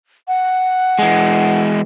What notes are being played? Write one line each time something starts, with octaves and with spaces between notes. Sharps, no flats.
F#5
E3 G#3